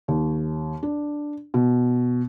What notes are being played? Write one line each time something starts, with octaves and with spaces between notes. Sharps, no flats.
D#2
D4
B2